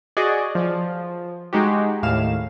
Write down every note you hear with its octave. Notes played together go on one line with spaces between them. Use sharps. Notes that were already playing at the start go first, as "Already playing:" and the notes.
F#4 G#4 D5 D#5
F3
G#3 D#4 F#4 G4
D#2 A2 F5 E7